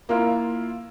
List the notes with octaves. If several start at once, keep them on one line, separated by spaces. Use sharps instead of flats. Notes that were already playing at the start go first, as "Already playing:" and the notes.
A#3 E4 F4 F6